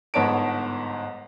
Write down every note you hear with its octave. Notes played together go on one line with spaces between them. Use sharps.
G1 G#2 B3 C#5 A5 D7